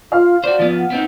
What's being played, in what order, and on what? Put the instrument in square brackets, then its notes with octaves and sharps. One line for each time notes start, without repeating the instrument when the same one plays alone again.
[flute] F4 [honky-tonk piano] F5
[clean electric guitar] F#4 C5 [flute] D5
[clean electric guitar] F3 B3
[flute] F#5
[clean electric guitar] B3 C4 D#4